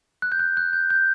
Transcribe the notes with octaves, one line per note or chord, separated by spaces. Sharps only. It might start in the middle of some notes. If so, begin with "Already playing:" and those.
F#6
G6
F#6
F#6
G6
G6